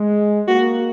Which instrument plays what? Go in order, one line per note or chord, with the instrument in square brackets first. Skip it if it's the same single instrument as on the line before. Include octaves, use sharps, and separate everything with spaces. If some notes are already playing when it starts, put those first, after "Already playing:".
Already playing: [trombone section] G#3
[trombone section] A#3 [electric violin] F#4